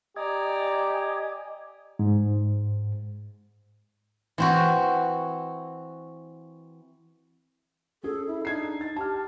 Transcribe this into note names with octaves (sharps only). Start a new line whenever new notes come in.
G4 D5 D#5 G#5 A#5
G#2
E3 C4 F#4
C#4 G#4 A4
E4
D4 D#4 G#6 C7
D#4 A6
G4 A5 F6